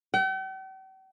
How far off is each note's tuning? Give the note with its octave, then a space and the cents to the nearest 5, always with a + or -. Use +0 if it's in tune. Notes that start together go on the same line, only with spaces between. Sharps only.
G5 -45